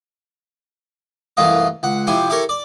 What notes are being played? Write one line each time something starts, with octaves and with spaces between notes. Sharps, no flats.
C2 F#2 E3 A3 F4 D#5
C#2 F#5
F2 C3 E4 G4 C5 G#5
E4 G4 A4 A#4 C#5
D5